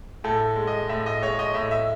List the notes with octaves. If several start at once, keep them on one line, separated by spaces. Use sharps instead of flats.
A2 A4
G#3
D#5
A2 E5
D#5
G#3 C#5
D#5
A2 E5
E5